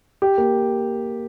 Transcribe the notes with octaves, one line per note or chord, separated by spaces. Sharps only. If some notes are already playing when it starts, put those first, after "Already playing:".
G4
A#3